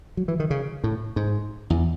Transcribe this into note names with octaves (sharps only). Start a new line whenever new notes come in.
F#3
E3
D#3
C#3
A2
G#2
E2